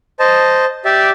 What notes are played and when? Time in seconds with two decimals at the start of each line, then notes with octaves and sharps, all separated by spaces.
0.19 C5 D#5 A5
0.85 G4 D5 E5